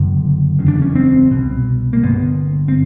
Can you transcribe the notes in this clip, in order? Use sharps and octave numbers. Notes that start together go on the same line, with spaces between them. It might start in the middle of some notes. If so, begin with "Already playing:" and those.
Already playing: F#1 F#2 D3
F#1 E2 C#3
D4
C#4
C4
C2 B2
A#3
G1 G2 D3 B3
C4